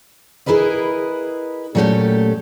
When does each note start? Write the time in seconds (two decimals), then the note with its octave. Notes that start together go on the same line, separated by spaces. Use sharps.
0.46 E4 G#4 A#4 B4 D#5
1.75 A#2 F#3 A3 C#4 G4 A4